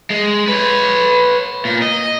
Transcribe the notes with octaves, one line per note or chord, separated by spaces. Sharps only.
G#3
B4 C#5
A#2
D#5